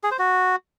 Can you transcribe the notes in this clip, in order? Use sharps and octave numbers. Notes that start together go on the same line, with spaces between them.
G#4
C5
F#4